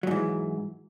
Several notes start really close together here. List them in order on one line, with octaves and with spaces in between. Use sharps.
F#3 G#2 E3